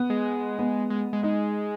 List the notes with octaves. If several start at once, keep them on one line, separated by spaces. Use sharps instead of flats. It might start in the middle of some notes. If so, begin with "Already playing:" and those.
Already playing: B3
G#3
B3
G#3
G#3
G#3 D#4